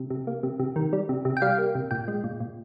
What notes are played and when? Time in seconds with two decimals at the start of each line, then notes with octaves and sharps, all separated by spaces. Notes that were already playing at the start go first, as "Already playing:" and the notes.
Already playing: C3
0.10 C3
0.27 A#3
0.43 C3
0.59 C3
0.76 D#3
0.93 G3
1.09 C3
1.25 C3
1.37 G5
1.42 G3 F5
1.58 A#3
1.75 C3
1.91 A#2 G5
2.08 G#3
2.24 A#2
2.40 A#2